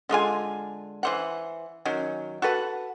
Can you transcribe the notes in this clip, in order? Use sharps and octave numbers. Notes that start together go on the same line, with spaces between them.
D3 G#3 F4 G#5
E3 C5 F#5
D#3 F#3 C#4
F#4 A4 B4 F#5